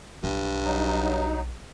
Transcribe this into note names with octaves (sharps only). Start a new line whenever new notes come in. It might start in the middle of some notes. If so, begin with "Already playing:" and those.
B1 G2
F#3 D#4